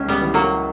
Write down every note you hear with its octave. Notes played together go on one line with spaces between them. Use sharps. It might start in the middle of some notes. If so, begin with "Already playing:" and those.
Already playing: C#2 C#3 C#4
G3 B3
E3
F#3 A#3